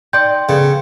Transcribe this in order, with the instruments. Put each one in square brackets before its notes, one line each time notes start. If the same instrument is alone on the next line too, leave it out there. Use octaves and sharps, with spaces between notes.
[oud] D#4 D5 [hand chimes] G5 C6 [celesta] G6
[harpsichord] C#3 [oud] B3 A4